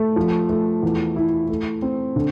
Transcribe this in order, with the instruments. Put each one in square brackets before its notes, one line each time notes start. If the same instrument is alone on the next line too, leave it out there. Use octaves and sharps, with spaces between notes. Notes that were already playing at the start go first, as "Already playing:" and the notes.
Already playing: [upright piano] A3
F3
A3
E2
E4
A3
C4
D3